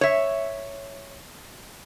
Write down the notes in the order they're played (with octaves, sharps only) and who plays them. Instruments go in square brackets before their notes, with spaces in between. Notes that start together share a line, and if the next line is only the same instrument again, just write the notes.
[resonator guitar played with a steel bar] C#5 E5